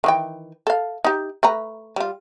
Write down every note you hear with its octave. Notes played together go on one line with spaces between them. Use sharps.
D#3 E3 G5
A4 F5
D#4 G4
A3 B4 A#5
G3 F4